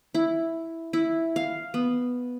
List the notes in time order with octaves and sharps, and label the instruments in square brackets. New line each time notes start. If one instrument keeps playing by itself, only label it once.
[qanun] E4
E4
F5
B3